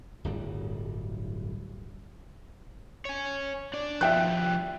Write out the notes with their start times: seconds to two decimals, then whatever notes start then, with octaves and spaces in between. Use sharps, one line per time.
0.24 D1 G1 G3
3.05 C#5 G#5
3.73 D4 D5
4.01 F3 G3 E5 G5 F#6